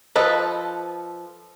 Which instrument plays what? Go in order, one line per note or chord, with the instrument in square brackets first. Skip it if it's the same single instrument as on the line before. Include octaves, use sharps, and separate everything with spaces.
[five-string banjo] F3 A4 B4 D#5